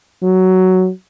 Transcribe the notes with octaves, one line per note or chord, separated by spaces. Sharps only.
F#3